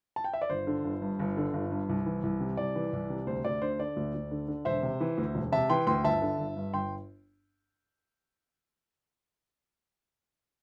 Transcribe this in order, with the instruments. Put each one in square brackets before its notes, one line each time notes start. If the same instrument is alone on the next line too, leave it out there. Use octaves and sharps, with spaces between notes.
[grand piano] A5
G5
E5
D5
G1 C5
D3
G1
G2
G1
D3
G1
G2
C2
E3
C2
C3
C2 D5
E3
C2
C3
D2 C5
D2 D5
D3 C5
D3 D5
D2
D2
D3
D3
E1 C5 E5
C3
E3
D2
E1
C3 E5 A5
E3 G5 C6
D2 G5 C6
G1 E5 A5
D3
G1
G2
G1 G5 C6